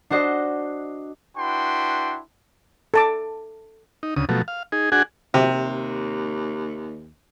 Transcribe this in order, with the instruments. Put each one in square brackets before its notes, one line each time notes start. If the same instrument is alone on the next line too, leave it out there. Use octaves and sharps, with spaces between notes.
[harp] D4 F#4 C5 D#5
[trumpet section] D4 E4 F#4 B4 G5 C6
[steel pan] A4 A5 D6
[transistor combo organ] D#4
D2 C#3 D#6
B2 F3 F#3 A3
F5
D#4 G#4
D4 F#4 G#4 F#5 G#5
[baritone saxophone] D#2 [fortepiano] C3